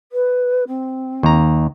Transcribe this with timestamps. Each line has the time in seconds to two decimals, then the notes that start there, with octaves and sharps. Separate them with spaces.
0.12 B4
0.67 C4
1.23 D#2 A#5